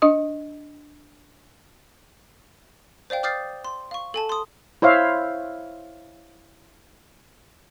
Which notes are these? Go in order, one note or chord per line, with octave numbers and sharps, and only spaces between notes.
D4 D#5 D#6
C5 D5 F5 G5
D6 D#6 F6 G6 A6 C7
C6
F5 C#6
A4 G#5 A5
C6 D#6
E4 C5 C#5 E5 F5